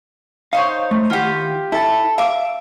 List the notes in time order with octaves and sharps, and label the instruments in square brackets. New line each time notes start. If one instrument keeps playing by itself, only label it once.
[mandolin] D#4 C5 C#5 [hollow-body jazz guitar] F5
[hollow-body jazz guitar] A3
[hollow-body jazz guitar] D#2 E4 F#5 [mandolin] F4 G4
[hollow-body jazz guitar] E4 [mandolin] A4 A5
[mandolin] E5 D6 [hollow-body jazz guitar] F5